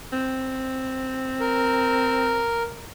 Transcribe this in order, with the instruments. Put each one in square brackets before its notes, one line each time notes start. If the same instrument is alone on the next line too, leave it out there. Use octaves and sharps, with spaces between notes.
[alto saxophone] C4
[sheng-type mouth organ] A#4